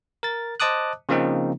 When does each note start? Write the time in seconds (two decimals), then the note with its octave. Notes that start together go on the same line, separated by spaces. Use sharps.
0.23 A#4 A6
0.60 C5 D#5 A5 D6 D#6 F#6
1.09 C#3 F3 A#3 C4 D#4